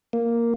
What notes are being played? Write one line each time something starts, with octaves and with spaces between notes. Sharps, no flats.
A#3